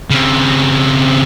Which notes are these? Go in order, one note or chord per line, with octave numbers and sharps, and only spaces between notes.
C#3 C4